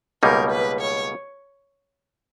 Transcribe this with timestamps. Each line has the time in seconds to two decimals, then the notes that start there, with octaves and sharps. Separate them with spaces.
0.22 C#2 B2 G3 A#3 D#4 A#4
0.51 B4
0.81 C#5